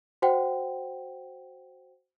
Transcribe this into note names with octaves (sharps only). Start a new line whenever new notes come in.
F#4 C5 F#5 G5